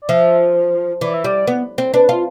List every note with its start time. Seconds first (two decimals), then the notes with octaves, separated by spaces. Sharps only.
0.02 D5
0.09 F3 E5
1.01 E3 D5
1.14 E5
1.24 G3 D5
1.47 B3
1.78 C4
1.93 D4 B4
2.09 F4